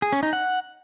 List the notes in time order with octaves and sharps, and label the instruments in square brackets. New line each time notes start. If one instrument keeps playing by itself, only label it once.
[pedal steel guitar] G#4
C#4
D#4
F#5